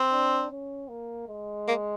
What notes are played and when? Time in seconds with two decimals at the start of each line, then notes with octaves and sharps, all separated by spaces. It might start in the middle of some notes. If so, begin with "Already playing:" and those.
Already playing: C4
0.12 D4
0.51 C#4
0.89 A#3
1.29 G#3
1.68 A#3